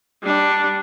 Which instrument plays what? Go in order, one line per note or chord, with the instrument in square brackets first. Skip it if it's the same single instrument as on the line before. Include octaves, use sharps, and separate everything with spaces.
[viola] G3 D4